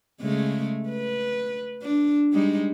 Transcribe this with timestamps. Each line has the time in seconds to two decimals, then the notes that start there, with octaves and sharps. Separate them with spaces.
0.21 C#3 G#3 A3
0.89 B4
1.83 D4
2.33 G3 G#3 D#4